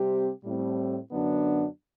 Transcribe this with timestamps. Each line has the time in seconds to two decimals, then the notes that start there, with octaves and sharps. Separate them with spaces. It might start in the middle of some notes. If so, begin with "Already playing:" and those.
Already playing: C3 G3 C4 G4
0.44 A2 G3 C4
1.12 F#2 D3 F#3 B3 D4